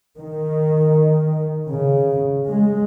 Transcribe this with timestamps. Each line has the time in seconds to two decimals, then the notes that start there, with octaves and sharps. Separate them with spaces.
0.18 D#3
1.69 C#3
2.47 G#3